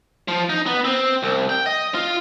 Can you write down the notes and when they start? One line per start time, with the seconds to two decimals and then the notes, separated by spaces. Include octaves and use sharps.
0.28 F3
0.50 D#4
0.67 B3
0.85 C4
1.23 C2
1.49 G5
1.66 D#5
1.95 F4